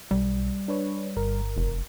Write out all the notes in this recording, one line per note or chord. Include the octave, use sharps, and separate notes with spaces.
B1 G3
D4 B4 C#5
G1 A#4
F1